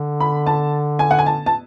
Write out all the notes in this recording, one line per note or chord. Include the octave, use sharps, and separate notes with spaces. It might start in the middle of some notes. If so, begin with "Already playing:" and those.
Already playing: D3
B5
A5
G#5
F#5
G#5
A5
A5